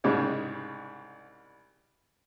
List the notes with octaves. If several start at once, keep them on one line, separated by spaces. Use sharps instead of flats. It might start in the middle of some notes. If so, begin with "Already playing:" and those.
C2 G#2 C#3 G3 G#3